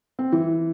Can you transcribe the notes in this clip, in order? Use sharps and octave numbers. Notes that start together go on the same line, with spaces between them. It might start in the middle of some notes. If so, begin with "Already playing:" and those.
C4
E3